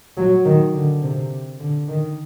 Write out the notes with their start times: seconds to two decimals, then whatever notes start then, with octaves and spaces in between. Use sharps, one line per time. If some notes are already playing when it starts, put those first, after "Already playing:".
0.17 F#3
0.45 D#3
0.74 D3
1.02 C3
1.60 D3
1.88 D#3